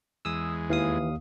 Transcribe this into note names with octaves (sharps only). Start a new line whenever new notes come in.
E2 G#3 D#6 E6
D#2 E3 F5 D#6